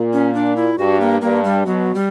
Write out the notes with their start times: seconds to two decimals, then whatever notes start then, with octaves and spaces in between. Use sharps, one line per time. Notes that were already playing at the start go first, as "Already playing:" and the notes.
Already playing: A#2
0.13 C#4
0.34 D4
0.56 E4
0.78 G2 F#4
1.01 A#3
1.21 G2 A#3
1.44 G3
1.65 B2 F#3
1.95 G3